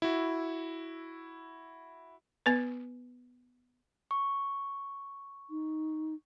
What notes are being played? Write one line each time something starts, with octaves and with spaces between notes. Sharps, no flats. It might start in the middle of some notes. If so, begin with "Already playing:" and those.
E4 F#4
B3 B4
C#6
D#4